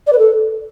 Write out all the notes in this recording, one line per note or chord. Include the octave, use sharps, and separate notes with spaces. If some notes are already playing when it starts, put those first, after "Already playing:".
D5
B4
A4